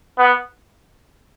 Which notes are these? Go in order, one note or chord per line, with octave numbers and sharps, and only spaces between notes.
B3